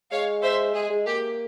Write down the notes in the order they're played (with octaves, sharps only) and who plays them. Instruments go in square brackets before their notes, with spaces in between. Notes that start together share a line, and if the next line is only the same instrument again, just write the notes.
[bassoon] G#3 [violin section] C#5 F5
[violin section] C5 E5
[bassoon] G#3 [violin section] G#4
[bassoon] G#3
[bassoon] A#3 [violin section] G4